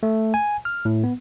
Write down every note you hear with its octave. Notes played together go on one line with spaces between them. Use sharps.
A3
G#5
F6
A2
B3